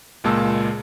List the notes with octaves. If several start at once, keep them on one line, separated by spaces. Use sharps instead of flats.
C#2 A#2 G#3 A#3 A5 E6